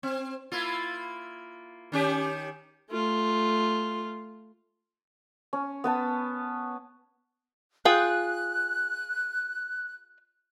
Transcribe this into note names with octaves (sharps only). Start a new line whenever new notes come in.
C4
A#3 E4 F4
D#3 C#4 G4
A3 F4
C#4
B3 B4 A5
F4 G#4 G5 F#6